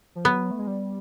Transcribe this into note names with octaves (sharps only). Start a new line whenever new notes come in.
F3
F#3 B3
A3
G#3
G3